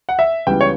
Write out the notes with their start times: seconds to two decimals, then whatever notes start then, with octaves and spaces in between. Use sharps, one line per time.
0.09 F#5
0.19 E5
0.47 C#2 C#3 E3 G3 B3 G5
0.61 C#5